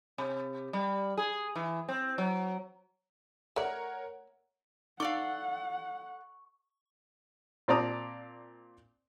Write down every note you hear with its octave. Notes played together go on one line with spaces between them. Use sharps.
C3
G3
G#4
E3
C4
F#3
A3 A#4 C#5 D5 F#5
D#4 A4 D5 F5 F#5 C#6 D6
A#2 C4 D5 A5 A#5 D#6